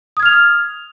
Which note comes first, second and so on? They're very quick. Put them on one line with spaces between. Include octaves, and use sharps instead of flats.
D#6 G#6 F6 F7